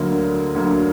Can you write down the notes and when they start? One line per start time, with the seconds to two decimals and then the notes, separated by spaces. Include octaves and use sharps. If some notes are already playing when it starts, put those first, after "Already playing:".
Already playing: D2 D3 F#3 A#3
0.55 D2 D3 F#3 A#3